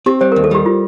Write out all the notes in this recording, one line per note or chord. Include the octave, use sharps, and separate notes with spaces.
C4 G4
G3 C5
D#2 A#4
A4
G3 G4
F4